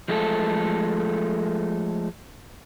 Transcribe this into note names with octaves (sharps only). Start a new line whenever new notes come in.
F3 G#3 A3 E4 A4